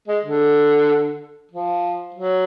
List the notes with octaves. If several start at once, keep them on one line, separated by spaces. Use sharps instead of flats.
G#3
D3
F3
F#3